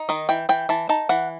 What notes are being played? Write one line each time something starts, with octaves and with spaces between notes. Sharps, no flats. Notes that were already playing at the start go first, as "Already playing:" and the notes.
Already playing: D#4
D#3 D#5
E3 G5
E3 G5
E3 A5
D#4 A5
E3 F#5